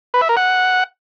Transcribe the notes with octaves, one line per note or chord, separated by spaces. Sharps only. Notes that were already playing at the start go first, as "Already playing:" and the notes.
B4
E5
A#4
F#5